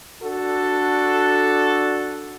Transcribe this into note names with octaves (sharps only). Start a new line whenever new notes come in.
D4 F#4 A4